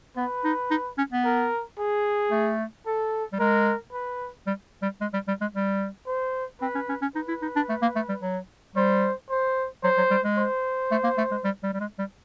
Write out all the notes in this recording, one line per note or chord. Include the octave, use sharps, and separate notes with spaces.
B3 B4
D#4
D#4
C#4
B3
A#4
G#4
A3
A4
G3
G#3 A#4
B4
G3
G3
G#3
G3
G3
G#3
G3
C5
C4 B4
C#4
C#4
C#4
D#4 B4
E4
D#4
D4
A3
A#3
A3
G3
F#3
G3 C5
C5
F#3 C5
F#3
G3
G#3
C5
A3
A#3
A3
G#3
G3
G3
G3
G#3
G3